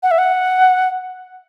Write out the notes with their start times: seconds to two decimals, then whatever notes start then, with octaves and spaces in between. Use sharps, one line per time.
0.03 F#5
0.11 E5
0.18 F#5